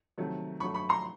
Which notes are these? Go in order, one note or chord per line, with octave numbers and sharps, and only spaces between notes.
C3 D#3 F#3 A3
D3 F#3 A3 B5 C#6
B5 C#6
A#5 C6